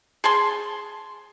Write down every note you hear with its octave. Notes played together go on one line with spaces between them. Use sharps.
G#4 A5 C6